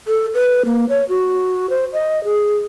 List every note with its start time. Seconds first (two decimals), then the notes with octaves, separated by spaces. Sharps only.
0.07 A4
0.34 B4
0.65 A#3
0.89 C#5
1.09 F#4
1.70 C5
1.93 D#5
2.24 G#4